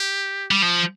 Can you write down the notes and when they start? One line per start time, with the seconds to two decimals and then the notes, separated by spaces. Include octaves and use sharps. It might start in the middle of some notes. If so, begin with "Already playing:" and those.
Already playing: G4
0.51 G3
0.62 F3